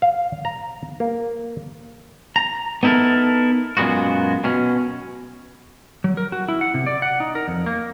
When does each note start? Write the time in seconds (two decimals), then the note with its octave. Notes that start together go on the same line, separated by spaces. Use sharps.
0.02 F5
0.45 A#5
1.00 A#3
2.36 A#5
2.83 B3 D#4 E4 A4 A#4
3.77 F#2 A#2 G#3 B3 F#4
4.44 B2 C#4
6.04 F#3
6.17 A#4
6.32 F#4
6.48 E4
6.61 F#5
6.74 C3
6.86 D5
7.02 F#5
7.20 D#4
7.35 A#4
7.48 F2
7.66 A#3